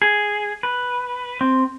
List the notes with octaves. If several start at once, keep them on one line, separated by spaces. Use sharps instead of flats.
G#4
B4
C4